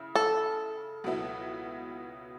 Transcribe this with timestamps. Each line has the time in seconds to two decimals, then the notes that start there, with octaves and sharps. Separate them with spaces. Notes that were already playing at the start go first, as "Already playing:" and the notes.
Already playing: C#3 E4
0.16 A4
1.04 C#2 B2 F#3 B3 E4